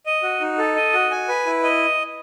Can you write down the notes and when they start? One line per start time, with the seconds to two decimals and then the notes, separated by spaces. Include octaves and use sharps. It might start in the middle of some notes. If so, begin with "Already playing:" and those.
0.06 D#5
0.23 F#4
0.41 D#4
0.58 A4
0.76 D#5
0.93 F#4
1.11 G#5
1.28 B4
1.46 E4
1.63 D#5